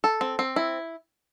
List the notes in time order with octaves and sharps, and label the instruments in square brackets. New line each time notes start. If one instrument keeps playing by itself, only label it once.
[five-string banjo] A4
C4
C4
E4